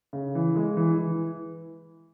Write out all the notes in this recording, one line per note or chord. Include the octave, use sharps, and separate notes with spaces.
C#3
E3
G#3
E3
E3